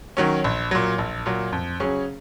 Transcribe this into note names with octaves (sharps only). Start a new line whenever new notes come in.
D#3 F#3 C#4
A#1
A#2 F#3
A#1
A#2 F#3
F2
C#3 F#3 C#4 G#4